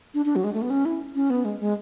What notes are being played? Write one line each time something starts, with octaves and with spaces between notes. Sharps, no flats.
D4
D4
F#3
G#3
A3
B3
C#4
E4
C#4
B3
G#3
G#3